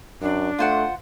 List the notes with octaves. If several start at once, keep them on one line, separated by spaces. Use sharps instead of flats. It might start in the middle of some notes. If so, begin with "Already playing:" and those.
F#2 D4
A3 F4 C5 F#5